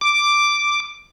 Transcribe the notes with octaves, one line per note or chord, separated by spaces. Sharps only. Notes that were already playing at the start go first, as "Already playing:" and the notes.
D6